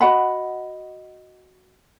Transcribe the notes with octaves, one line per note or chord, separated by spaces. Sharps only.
F#4 D#5 F#5 B5